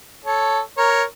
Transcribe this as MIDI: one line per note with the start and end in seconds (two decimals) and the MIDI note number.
0.25 0.60 69
0.25 0.60 73
0.77 1.03 70
0.77 1.03 73